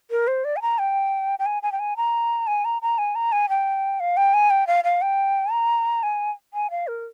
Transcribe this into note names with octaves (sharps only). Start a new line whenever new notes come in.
A#4
C5
D5
G#5
A#5
G5
G5
G#5
G#5
G5
G#5
A#5
G#5
A#5
A#5
G#5
A#5
G#5
G5
F5
G5
G#5
G5
F5
F5
G5
A#5
G#5
G#5
F5
A#4